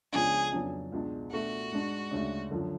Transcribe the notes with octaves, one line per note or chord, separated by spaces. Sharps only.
C#2 C#3 F3 B3 D4 G#4
F2 C#3 F#3 B3 D4
C#2 B2 G#3 D4
B2 A3 D4 F#4
G#2 G#3 D4
D2 C#3 G#3 D4
F#2 D3 F3